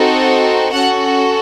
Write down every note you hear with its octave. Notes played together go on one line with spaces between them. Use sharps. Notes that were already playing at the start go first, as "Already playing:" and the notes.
Already playing: C4 D#4 F#4 A4
C#4 F#4 A4 F#5